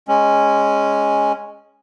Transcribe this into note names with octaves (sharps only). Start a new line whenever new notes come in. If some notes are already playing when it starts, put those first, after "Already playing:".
G#3 C#4